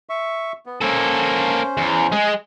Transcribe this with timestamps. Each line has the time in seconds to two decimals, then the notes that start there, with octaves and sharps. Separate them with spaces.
0.09 E5 C#6
0.66 B3
0.82 A#3 C#4 A4 C5
1.77 E2
2.12 G#3 G#4